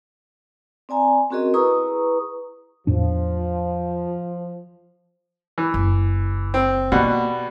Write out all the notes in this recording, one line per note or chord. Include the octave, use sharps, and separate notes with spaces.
C4 D5 G#5 A#5
C4 C#4 F#4 G#4 A#4 D#5
E4 G#4 B4 A#5 C#6 D#6
E2 A2 F3 D4
E3
F#1
C4
B2 G3 A#3 F#5